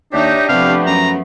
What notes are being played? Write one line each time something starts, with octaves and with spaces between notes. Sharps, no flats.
D#2 D4 D#4 G4 C#5 E5
C3 F3 A3 B3 F5
F#2 A#5